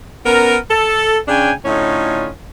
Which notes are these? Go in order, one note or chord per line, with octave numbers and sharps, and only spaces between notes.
B3 C#4 A#4
A4
C#3 C#4 D4 G5 G#5
A2 D3 C#4 D#4 F4